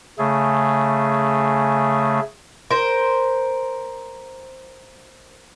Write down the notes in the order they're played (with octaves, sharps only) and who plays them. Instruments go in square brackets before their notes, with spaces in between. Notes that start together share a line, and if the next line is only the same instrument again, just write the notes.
[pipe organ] C#3 A3 G#4
[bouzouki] A#4 C5